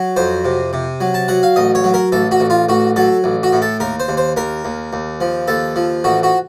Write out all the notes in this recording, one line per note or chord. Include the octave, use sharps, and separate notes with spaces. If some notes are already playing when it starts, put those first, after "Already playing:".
Already playing: F#3
F2 C5
C3
C3
F#3
A5
F#3 F#5
F5
A1 D#5
C#5
F#3
A#4
A1 A4
F#4
A1
F4
A1 F#4
F#3 A4
A1
F#4
A2
A4
D#2 A#4
C5
D#2
C5
D#2 A#4
D#2
D#2
F3
D#2 A4
F3
A1 F#4
F#4